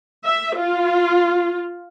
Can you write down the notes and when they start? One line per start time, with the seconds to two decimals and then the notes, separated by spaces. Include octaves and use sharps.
0.24 E5
0.57 F4